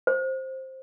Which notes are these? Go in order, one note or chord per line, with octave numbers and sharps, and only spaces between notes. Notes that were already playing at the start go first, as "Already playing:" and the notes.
C5